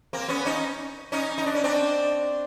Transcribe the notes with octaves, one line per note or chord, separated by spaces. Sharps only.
A#3 C4
B3 C#4
C#4 D#4
C#4 D#4
D#4
D4
C#4
C4 D4